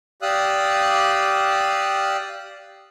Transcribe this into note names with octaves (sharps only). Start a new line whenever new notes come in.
G4 D5 F5 D#6 E6 F#6